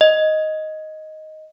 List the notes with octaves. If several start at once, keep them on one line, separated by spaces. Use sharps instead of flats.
D#5